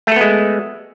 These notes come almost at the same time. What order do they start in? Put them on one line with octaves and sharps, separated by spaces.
A3 A4 B3 G#3